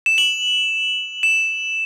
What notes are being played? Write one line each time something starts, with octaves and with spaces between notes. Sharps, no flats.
E7
F#7
E7